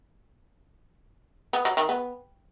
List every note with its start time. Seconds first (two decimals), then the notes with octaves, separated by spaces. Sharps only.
1.53 B3
1.65 F#3
1.77 D#3
1.89 B3